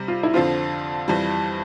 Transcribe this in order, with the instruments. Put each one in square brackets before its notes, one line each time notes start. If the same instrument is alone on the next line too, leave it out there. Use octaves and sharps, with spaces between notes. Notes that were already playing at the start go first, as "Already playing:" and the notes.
Already playing: [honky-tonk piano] C3 G3
[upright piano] F4
E4
[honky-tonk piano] F2 D3 F3 C4 [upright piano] F4
[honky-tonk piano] F2 E3 G3